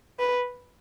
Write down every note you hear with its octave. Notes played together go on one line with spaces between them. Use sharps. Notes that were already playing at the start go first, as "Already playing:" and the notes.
B4